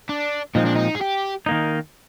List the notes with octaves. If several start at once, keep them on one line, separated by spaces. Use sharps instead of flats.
D4
A#2 F3 G#3 C4 D#4
D4
D#4
G#4
G4
D#3 A#3 D#4